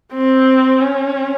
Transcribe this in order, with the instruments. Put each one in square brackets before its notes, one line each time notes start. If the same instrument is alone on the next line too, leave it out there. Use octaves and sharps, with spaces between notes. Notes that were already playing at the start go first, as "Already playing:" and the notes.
[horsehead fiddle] C4
C#4